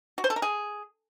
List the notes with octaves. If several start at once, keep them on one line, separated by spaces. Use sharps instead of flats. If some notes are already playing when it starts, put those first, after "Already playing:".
F#4
C5
A4
A#4
G#4